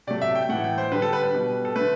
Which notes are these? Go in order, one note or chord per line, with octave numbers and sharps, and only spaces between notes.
C3 F#3 A3 D5
E5
G5
A2 E3 A3 F#5
G5
C5
D3 G3 B4
A4
B4
B4
B2 G3
A4
D3 A3 B4